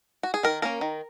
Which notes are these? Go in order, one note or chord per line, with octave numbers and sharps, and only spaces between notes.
F#4
G#4
D#3 A#4
A#3 C#4 A#4
D#3